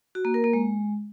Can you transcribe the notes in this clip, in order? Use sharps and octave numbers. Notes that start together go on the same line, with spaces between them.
F#4
A#3
A#4
A#3
G#3